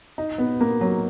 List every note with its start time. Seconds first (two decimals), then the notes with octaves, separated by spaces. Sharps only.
0.18 D#4
0.38 B3
0.61 A#3
0.81 F#3